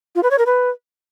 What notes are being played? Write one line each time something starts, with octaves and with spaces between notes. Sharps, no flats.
F4
B4
C#5
A#4
B4